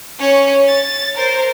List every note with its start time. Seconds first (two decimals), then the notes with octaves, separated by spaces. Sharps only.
0.19 C#4 C#5
0.68 A6
1.15 A#4 C5